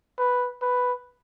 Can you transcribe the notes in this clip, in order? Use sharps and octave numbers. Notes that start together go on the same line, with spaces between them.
B4
B4